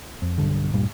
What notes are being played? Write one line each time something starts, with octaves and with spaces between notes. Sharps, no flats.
F2
B1 G2 D3
D2 G2 A#2 G3